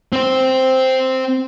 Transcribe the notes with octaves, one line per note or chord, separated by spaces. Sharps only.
C4 C5